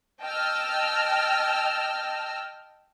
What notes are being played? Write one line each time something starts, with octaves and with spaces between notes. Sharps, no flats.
D#5 G5 A5 E6 F6